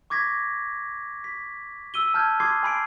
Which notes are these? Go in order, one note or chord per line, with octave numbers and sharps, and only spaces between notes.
C#6 D6 G#6 A#6 B6
B6
E6 D#7 G7
A5 F6 G6 G#6
C6 D6 D#6 G#6 C7
G#5 B5 C7 D7